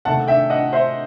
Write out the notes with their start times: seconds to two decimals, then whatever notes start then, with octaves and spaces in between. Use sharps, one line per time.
0.05 C3 D#3 A3 F#5 A5
0.28 E5 G5
0.50 D#5 F#5
0.73 C5 E5